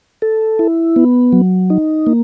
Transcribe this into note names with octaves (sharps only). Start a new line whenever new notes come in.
A4
E4
B3
F#3
D#4
A#3